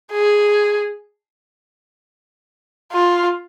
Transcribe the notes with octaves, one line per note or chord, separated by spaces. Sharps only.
G#4
F4